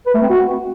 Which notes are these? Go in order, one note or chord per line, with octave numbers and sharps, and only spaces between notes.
B4
A3
C4
F#4